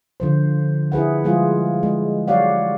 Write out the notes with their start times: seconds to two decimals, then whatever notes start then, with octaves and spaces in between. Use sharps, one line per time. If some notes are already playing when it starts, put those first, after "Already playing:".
0.20 D3 F3 C5
0.92 E4 G#4 B4 F#5
1.24 F3 G3 G#3 F4 G#4
1.83 G#3
2.28 F#3 G4 C#5 D5 F5 F#5